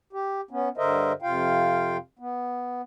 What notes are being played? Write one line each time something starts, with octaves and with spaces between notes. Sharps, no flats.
G4
B3 C#4
G2 D3 A#4 C5 D#5 E5
F2 C3 F4 F5 G5
B3